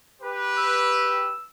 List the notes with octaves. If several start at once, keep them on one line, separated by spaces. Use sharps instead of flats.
G4 B4
E6